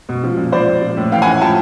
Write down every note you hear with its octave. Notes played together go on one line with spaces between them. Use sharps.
B2
F3
A#2
F3 C5 D5
A#2
F3
A2
E3 F5 G5
F#5 G#5
A2
F3 G5 A5